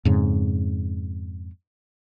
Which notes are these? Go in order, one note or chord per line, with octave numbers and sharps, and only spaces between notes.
F2 G#2 C#3